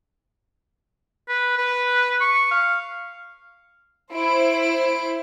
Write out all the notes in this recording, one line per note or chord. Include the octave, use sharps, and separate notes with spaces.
B4
B4
C#6
F5
E4 C5 D7